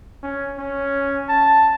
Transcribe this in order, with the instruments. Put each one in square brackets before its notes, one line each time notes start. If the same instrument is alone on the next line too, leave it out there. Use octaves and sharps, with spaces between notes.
[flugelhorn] C#4
C#4
A5